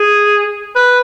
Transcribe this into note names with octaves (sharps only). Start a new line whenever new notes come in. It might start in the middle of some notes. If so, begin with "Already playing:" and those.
Already playing: G#4
B4